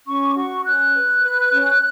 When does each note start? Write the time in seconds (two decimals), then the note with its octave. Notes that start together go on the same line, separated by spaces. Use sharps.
0.07 C#4 C#6
0.25 D6
0.36 F#4 C#6
0.65 C#4 F#6
0.94 B4
1.23 B4
1.52 C#4